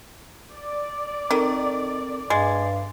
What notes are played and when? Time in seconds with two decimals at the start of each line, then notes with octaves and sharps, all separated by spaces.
0.53 D5
1.31 D#3 C4 A4 A#4
2.30 G2 G#3 A6